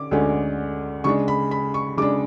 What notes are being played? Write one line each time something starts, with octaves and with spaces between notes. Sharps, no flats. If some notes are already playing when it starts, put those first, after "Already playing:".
Already playing: D3 C#4 D6
D2 D3 G#3 C#4
C#3 G#3 D4 C#6
B5
B5
C#6
C#3 G#3 D4 D6